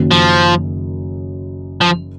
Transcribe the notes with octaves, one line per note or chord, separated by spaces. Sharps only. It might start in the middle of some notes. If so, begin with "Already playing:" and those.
Already playing: F#1 F#2 D#3 F#3
F3
F3